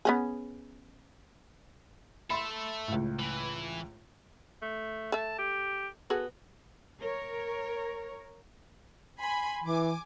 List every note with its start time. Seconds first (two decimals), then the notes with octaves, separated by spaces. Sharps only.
0.05 B3 C#4 G#4
2.30 A4 E5 B5 C6
2.88 C#2 A2
3.19 E3
4.62 A3
5.12 A3 E5 A5
5.38 G4
6.10 B3 F#4 G#4 A4
7.01 A#4 C#5
9.18 G#5 B5 C6
9.64 E3 G#5 D6